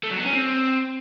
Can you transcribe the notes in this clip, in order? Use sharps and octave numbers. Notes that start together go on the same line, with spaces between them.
A3
F#3
B3
C#4
C4